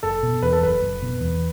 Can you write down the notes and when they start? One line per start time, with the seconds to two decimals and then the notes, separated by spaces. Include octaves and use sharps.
0.03 F#1 A4
0.23 B2
0.42 E2 B4
0.52 A4
0.62 F#1 B4
0.82 F#1
1.02 B2
1.21 E2